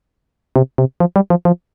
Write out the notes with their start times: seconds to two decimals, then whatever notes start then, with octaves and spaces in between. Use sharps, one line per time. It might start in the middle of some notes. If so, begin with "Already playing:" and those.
0.56 C3
0.78 C3
1.00 F3
1.16 G3
1.30 F3
1.45 F3